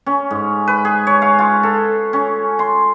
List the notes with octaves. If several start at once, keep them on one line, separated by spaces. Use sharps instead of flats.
C#4
G#2
B4
G#4
C#5
F5
F4
A4
C#4
C6